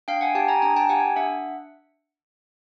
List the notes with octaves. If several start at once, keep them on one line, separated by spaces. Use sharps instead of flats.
D4 F5 G5
F#5 G#5
G4 G5 A5
G#5 A#5
D4 G#5 A#5
G5 A5
G4 F#5 G#5
D4 E5 F#5